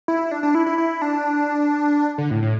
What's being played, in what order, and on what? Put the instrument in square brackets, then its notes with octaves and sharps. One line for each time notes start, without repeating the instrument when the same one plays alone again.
[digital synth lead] E4
D4
D4
E4
E4
E4
D4
D3
A2
A2